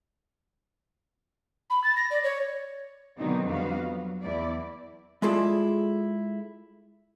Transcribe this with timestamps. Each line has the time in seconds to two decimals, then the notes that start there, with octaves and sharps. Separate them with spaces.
1.70 B5
1.84 A6
1.96 A#6
2.10 D5
2.24 C#5
3.17 B2 D3 D#3 F#3 C4 D#4
3.47 F2 G3 B3 F#4 F5
3.82 F#3
4.24 E2 E4 D5
5.22 G#3 E4 F4 G#4 A4 D5